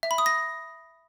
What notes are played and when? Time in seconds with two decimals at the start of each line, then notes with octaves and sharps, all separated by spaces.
0.03 E5
0.11 B5
0.18 D#6
0.26 A#6